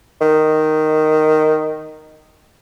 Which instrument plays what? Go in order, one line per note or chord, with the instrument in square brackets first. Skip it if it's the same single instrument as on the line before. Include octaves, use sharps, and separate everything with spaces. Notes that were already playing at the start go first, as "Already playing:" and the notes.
[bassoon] D#3